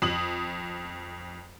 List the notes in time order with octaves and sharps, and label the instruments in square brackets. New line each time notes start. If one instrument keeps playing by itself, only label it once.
[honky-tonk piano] F2 D#6 F#7